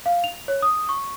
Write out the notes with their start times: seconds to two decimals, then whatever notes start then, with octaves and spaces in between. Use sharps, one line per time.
0.06 F5
0.24 F7
0.48 C#5
0.62 D#6
0.89 C#6